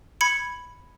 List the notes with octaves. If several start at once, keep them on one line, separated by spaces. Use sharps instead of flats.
B5 G#6 C#7